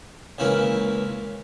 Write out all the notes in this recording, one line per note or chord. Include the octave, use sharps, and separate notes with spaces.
C#2 C#3 E3 A#3 E4